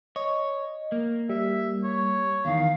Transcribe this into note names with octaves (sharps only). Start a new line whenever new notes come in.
C#5 D#5
A#3
G3 E5
C#5
E2 D#3 F5